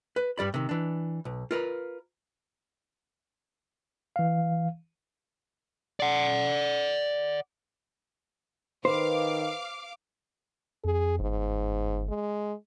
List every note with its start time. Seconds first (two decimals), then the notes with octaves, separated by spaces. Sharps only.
0.16 B4
0.38 G2 G3 D5 B5
0.54 C3 D#3
0.69 E3 D4
1.25 B1
1.51 F4 A#4 B4
4.16 E3 F5
6.00 D5 F#5
8.85 D#3 B4 C5 F5 D6
10.84 F2 G#4
11.20 G1 G#2
12.09 G#3